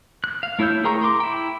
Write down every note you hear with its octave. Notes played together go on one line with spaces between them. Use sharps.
F#6
F5
A3 E4 C#5 E6 G6
G#4 A#4 G5 A#5 C#6
A#5 C6 D6
E4 G5